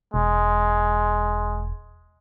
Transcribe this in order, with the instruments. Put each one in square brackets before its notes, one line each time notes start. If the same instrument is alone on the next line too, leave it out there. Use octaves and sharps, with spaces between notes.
[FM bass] E1 [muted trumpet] G#3